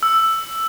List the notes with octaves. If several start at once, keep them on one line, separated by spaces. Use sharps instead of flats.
E6